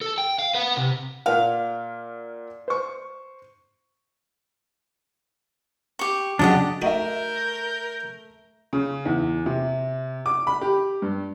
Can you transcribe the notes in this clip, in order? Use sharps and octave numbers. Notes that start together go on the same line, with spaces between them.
A4
G5
F5
B4 F#5
C3
A#2 A#4 F5 F#5
C5 C#6
G4 C#6
C#3 F#3 D4 G4 D#5 F#5
A3 D#4 F#4 A#4 E5 G5 G6
C#3
E2
C3
D6
B5
G4
G2